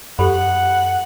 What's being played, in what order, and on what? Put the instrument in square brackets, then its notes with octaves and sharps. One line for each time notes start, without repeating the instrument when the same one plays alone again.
[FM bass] F#2 [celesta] G4 A4 B5 [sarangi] F#5